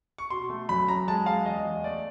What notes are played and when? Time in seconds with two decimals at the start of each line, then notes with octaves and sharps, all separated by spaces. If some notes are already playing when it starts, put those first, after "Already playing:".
0.18 C#6
0.30 B2 C6
0.50 A3
0.69 F#2 B5
0.88 F#2 A#5
1.08 G#3 A5
1.26 G#3 F5
1.46 E2 D#5
1.65 E2
1.84 A3 D5